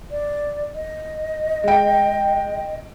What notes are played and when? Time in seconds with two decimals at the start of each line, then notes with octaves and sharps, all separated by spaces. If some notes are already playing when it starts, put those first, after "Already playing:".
0.11 D5
0.75 D#5
1.64 G#3 G5